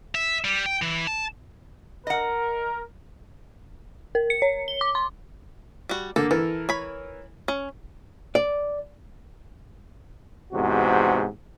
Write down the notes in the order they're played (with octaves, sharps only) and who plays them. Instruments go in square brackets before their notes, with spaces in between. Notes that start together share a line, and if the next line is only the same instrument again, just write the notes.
[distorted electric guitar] E5
G3
G5
E3
A5
[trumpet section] A#4 [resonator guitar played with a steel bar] D#5 F#5
[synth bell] A#4
C#7
C#5
G7
D6
C6
[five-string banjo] G3 F#4
[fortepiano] D3 A#3 [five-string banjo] A4
[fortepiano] E3 A#4 [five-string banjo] A4
[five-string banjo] C#5 B5
C#4
[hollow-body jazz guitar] D5
[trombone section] E2 G#2 C3 F#4